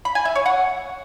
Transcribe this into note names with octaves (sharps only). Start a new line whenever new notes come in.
B5
G#5
E5
C#5
F#5